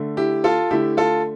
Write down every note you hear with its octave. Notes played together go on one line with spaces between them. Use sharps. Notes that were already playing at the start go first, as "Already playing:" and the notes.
Already playing: D3 A3
E4 G4
F4 A4
D3 A3 E4 G4
F4 A4